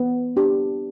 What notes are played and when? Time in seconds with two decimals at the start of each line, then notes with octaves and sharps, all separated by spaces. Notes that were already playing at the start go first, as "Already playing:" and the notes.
Already playing: B3
0.36 D4 G4